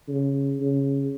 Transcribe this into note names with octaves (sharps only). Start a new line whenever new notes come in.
C#3
C#3